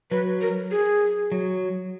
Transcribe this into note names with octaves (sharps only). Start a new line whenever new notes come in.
F#3 B4
A#4
G#4
F#3